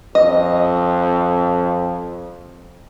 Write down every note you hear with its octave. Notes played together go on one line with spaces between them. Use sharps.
F2 D#5